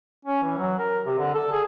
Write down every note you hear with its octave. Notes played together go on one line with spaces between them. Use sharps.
C#4
E3
F#3
A#4
C3
D3
A4
G#4